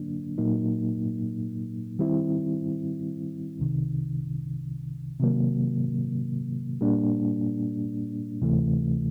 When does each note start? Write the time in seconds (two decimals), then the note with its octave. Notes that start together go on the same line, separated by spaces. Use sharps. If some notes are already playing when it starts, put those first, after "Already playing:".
Already playing: D3 F#3 A#3 D4
0.38 A#2 F#3 A#3 D#4
1.99 D#3 G3 C4 E4
3.59 C2 C3 D#3
5.20 C3 D#3 F#3 A#3
6.81 A#2 G3 A#3 D4
8.42 D2 C3 E3 A3